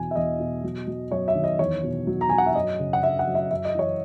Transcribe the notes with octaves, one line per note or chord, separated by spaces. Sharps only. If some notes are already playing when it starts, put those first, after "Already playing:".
Already playing: E2 B2 G#5
E5
E2 D#5
B2
F#3
F#3
F#2 C#5
E5
D#3
D#5
E2 C#5
B2
F#3
A#5
F#3 G#5
F#5
E5
F#2 D#5
C#3
F#5
F#2 E5
F#5
F#2
E5
F#2 E5
D#5
E3 C#5